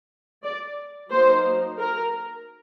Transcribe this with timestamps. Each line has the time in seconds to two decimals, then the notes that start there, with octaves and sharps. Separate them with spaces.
0.43 D5
1.11 F#3 A#3 D#4 C5
1.79 A#4